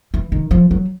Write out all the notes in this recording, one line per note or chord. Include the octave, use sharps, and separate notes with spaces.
E3
D#3
F3
F#3